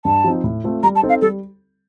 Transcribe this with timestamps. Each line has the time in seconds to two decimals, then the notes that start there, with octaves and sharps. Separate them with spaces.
0.05 G2 A5
0.24 F3 C4 D#4
0.44 A2
0.64 A3 C4 F4
0.83 G3 A#5
0.95 A5
1.02 C4 D#4 A4 C5
1.09 F5
1.21 G3 A4